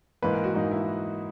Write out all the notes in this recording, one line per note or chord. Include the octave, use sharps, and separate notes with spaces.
G#2 E3 A#3 B4
A#4
F#4
G#2 E3 A#3 D#4
E4